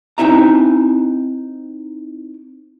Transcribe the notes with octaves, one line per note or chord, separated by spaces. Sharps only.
C4 D#4 E4 E5 A#5